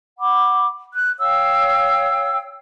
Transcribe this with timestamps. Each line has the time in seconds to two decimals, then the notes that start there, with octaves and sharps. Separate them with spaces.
0.17 F#5 B5 D6
0.92 F#6
1.19 C#5 F5 G5 E6